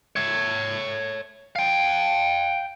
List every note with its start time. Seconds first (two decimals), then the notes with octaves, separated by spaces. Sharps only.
0.16 C#5 E5
1.56 F5 G5